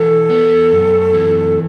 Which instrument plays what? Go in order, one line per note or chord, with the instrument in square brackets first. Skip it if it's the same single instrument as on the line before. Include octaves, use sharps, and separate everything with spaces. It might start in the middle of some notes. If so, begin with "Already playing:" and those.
Already playing: [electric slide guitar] E3 F#4 [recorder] A4
[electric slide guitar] B3
F#2
E3